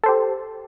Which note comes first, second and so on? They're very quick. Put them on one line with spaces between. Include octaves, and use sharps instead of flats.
A4 C5 G4